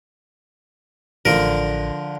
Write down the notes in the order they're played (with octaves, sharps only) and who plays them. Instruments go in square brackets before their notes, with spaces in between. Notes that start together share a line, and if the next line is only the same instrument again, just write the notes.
[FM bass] A1 [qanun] D3 [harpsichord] F3 A#4